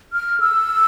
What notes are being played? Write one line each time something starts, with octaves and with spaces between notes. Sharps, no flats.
F6
E6